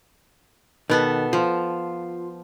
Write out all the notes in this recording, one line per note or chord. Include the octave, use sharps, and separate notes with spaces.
B2 D#3 B3 A4
F3 F4